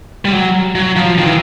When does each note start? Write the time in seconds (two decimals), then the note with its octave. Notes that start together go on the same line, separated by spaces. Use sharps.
0.25 G3
0.33 F#3
0.75 F#3
0.96 F3
1.18 D#3
1.25 E3